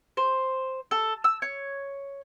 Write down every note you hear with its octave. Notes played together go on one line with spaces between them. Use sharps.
C5
A4
E6
C#5